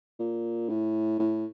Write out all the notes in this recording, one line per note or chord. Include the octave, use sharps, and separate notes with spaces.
A#2
A2
A2